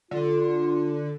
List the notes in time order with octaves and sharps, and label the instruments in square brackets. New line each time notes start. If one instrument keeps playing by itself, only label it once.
[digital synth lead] D3 [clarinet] F4